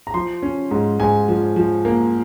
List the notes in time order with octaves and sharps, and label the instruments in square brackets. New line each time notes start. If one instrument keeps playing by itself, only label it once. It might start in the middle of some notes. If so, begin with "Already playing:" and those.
[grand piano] A#5
F3 C6
C#4
G#2
G#2 G#5
F3
F3
A#3